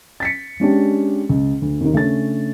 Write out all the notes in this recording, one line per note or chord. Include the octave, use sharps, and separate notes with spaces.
A6 B6 C#7
G#3 C#4 D4 G4
C#2
D2
D#2 D#3
C#3 A3 C#4 D4 A6